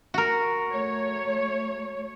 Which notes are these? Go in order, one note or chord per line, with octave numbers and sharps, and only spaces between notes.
F#4 A#4
A3 C#5